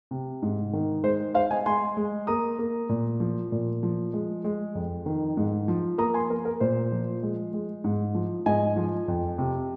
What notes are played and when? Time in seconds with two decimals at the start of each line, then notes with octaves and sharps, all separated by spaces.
0.11 C3
0.42 G#2
0.73 D#3
1.03 G#3 C5
1.34 G#3 C5 F5
1.51 D#5 G#5
1.66 G#3 G#5 C6
1.97 G#3
2.27 A#3 A#5 D#6
2.59 A#3
2.89 A#2
3.20 F3
3.52 A#2
3.83 F3
4.13 G#3
4.44 G#3
4.75 F2
5.06 D#3
5.37 G#2
5.68 F3
5.98 A#3 A#5 D#6
6.14 G#5 C6
6.30 A#3 A#4
6.45 A#4
6.60 A#2 C5
6.92 F3
7.23 G#3
7.53 G#3
7.84 G#2
8.15 F3
8.46 G#2 D#5 G#5
8.76 F3
9.08 F2
9.38 C3